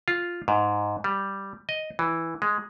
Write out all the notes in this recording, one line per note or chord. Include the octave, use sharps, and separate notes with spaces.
F4
G#2
G3
D#5
E3
G#3